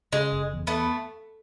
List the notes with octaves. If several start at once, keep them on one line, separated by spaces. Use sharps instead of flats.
C#3 G#3
F#1
E2
A3 B3